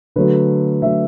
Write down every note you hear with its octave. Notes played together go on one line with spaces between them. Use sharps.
D3 F#3 A3 B4
D3 F#3 A3 E5